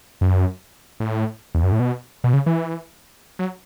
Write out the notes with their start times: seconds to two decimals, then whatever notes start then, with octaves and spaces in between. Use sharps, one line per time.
0.21 F#2
1.00 A2
1.55 E2
1.63 F#2
1.72 A2
1.80 B2
2.24 B2
2.33 C#3
2.46 E3
3.39 F#3